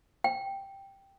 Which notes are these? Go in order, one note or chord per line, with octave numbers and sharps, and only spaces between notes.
G5